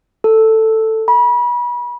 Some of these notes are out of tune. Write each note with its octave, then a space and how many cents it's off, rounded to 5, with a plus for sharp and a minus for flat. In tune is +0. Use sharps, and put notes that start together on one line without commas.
A4 +10
B5 -30